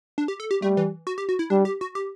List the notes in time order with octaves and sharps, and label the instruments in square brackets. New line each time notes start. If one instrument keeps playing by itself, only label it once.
[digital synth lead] D4
G4
A4
G4
[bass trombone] G3 [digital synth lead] A3
[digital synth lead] E3
F#4
G4
F#4
E4
[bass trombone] G3 [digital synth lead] D4
[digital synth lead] G4
F#4
G4